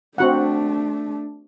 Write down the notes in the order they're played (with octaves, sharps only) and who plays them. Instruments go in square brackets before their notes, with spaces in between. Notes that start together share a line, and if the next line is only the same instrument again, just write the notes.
[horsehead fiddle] A3 D4 [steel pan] C4 F#4 F#5